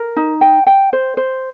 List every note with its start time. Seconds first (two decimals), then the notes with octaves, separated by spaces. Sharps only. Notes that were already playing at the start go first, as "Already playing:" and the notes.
Already playing: A#4
0.16 D#4
0.41 G5
0.67 G5
0.93 C5
1.17 C5